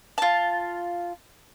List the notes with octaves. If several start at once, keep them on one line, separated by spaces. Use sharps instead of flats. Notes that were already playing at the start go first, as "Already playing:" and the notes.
F4 A5